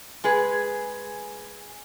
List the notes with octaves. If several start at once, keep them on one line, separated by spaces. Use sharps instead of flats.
G#3 G#4 B4